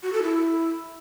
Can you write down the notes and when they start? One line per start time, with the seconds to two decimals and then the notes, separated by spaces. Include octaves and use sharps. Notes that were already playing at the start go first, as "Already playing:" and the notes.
0.03 F#4
0.13 A4
0.23 E4